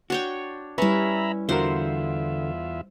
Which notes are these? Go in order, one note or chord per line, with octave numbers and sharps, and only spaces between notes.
D4 F#4 C#5 G5
G3 C#4 E4 B4 E5 A#5 B5
E2 D3 F4 F#4 A#4 C5 E5